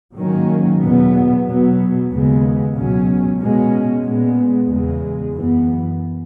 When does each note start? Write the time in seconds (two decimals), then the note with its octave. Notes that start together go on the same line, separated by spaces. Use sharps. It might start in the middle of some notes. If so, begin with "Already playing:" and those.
0.17 G#2 D#3 F#3 A#3 C#4
0.81 E2 B2 F#3 B3
1.45 B2 F#3 B3
2.10 D#2 C#3 G#3 B3
2.74 C#2 B2 F#3 C#4
3.39 B2 G#3 C#4
4.03 A#2 G#3 B3
4.67 E2 C#3 G#3
5.31 F#2 E3 B3